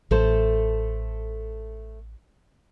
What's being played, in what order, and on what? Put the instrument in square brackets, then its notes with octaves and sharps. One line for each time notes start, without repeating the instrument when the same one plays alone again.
[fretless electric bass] A1 [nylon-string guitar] A3 A4 C5